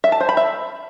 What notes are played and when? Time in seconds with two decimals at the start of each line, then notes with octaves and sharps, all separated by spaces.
0.04 E5
0.12 A5
0.20 C5
0.29 B5
0.37 E5